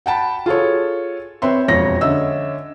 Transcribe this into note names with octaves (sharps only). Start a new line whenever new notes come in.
F#5 G5 A5 B5
F4 G#4 A4 C#5
C4 B4 C#5 E5 C6
E1 F2 C#5 A#6
D3 C#4 D#5 E5 E6